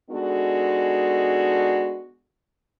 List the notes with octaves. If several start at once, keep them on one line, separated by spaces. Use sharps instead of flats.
G#3 B3 D4 D#4 F#4 A4